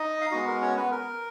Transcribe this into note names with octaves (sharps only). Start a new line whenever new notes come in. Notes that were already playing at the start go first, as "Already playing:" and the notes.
Already playing: D#4 D#5
F5
G#3 B3 D#4 F#4 D#5
A#4
C#4 C#5
B3 B4
A#4